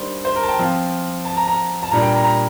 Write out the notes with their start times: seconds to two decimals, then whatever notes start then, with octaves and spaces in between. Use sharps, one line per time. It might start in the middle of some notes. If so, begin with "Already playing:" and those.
Already playing: D#3 G3 D4 C5
0.25 C5
0.36 A#4
0.43 A5
0.48 G5
0.59 F3 C4 F4
1.25 A5
1.37 A#5
1.47 A#5
1.83 A5
1.91 A#2 G3 D4 A#5
2.02 G5
2.14 A#5
2.24 A#5